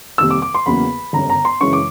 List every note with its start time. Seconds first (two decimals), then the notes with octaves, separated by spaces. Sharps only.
0.18 F2 C3 D#3 G3 A#3 E6
0.30 D6
0.42 D6
0.55 C6
0.66 E2 C#3 F#3 A#3 B5
1.13 G1 F#2 C#3 A#5
1.30 A#5
1.45 C6
1.61 F#2 C#3 E3 G#3 C#6
1.73 D6